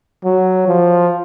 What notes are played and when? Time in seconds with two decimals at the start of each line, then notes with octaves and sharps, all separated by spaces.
0.24 F#3
0.68 F3